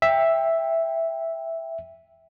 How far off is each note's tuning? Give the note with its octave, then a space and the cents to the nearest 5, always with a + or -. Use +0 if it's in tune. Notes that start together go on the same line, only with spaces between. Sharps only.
E5 +0 G5 +20